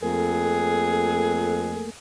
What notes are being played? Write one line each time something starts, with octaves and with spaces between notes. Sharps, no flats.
F2 A3 A#3 G#4